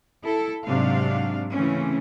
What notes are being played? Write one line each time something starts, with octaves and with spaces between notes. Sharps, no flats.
E4 A4
G#2 C3 F#3 D4 F5
C#3 E3 A3 C4 C#4